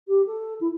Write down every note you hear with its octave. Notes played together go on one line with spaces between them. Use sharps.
G4
A4
E4